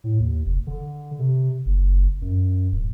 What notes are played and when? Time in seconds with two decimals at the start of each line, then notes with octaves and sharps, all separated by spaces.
0.04 A2
0.20 D#2
0.45 F1
0.67 D3
1.19 C3
1.66 F#1
2.21 F#2
2.72 D1